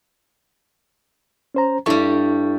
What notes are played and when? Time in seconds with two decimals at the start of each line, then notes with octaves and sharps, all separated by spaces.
1.55 C#4 C5 A#5
1.86 G2 G3 E4 A4 C#6